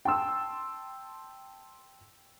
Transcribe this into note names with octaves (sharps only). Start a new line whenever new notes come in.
G5 A5 C6 E6